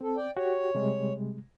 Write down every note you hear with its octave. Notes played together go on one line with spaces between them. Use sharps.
C4 A4
D5 G5
F#4 G4 C#5
C3 G3 G#3